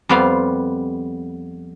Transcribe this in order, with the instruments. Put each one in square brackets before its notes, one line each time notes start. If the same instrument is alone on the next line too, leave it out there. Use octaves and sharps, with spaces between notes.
[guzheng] F2 G3 B3 F4 F5